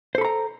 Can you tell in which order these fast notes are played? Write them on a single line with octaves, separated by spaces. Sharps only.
C5 A4 B5 A#5